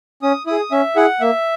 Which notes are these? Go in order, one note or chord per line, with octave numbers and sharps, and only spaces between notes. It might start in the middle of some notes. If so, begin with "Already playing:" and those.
C#4 D#6
E4 G#4 D#6
C#4 E5
E4 G#4 F#5
A#3 E5